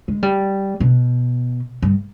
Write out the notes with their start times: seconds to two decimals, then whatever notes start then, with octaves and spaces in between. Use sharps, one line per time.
0.08 G#3
0.22 G3
0.80 B2
1.82 G2